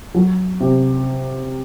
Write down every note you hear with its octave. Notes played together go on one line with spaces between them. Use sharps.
F#3
C3